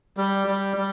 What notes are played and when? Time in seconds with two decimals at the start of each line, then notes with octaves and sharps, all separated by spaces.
0.17 G3
0.47 G3
0.77 G3